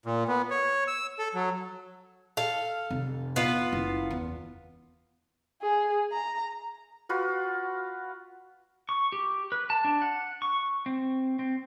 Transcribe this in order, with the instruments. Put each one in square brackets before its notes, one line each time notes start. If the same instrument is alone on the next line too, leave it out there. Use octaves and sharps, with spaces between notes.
[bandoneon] A#2
B3
C#5
E6
A4
F#3
[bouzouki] A4 F5
[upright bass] F1 F2
[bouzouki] B3 F4
[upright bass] F#1
E2
[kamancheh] G#4
A#5
[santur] F4 F#4 B4
[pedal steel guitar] C#6
G4
B4
A5
D4
F#5
C#6
C4
C4